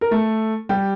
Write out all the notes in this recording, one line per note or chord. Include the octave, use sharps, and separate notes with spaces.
A#4
A3 A4
G3 G4